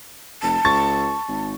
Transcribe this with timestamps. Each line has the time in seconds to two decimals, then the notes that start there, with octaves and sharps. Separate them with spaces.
0.42 F1 A5
0.65 C#2 C#6 A6
1.28 G#1